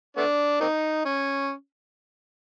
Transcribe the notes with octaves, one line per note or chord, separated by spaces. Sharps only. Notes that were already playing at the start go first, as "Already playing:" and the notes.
A3 B3 D4
A#3 C4 D#4
C#4